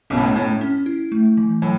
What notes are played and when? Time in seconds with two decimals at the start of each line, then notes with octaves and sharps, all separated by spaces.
0.10 B1 B2 C#4
0.17 A2
0.23 F#2
0.35 A2 C#4
0.61 C#4
0.86 E4
1.12 A3
1.37 E3
1.62 A2 F#3